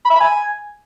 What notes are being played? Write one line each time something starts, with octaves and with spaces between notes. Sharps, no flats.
B5
E5
B5
G#5